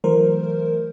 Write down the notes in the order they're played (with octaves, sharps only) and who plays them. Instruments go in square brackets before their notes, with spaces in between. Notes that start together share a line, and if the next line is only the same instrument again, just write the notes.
[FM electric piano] E3 F#3 A3 A#4 C5